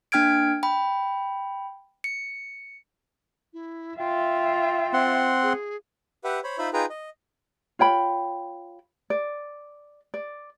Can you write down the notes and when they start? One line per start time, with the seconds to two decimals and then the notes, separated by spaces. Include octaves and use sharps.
0.12 A#3 D4 G5 F6 G#6 D7
0.63 G5 B5
2.04 C#7
3.53 E4
3.98 F4 E5 G5
4.93 C4 F#5 C6
5.42 G#4
6.24 G4 B4 E5 F#5
6.44 C5 C#5 B5
6.58 D#4 F4 C5 E5 B5
6.73 D#4 F4 G#4 B4 G5 A#5
6.90 D#5
7.79 F4 C#5 G5 B5
9.10 D5
10.14 D5